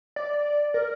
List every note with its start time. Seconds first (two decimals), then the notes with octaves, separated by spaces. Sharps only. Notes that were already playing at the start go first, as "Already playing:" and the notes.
0.16 D5
0.74 A#4